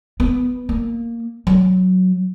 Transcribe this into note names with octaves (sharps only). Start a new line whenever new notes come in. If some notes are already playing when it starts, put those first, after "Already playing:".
B3
A#3
F#3